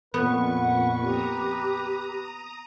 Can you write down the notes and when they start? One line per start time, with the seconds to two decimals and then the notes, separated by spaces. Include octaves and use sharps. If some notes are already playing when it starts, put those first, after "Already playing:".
0.14 F2 A#2 B3 B4 C#6
0.59 F#5
1.03 G4 A#5 D#6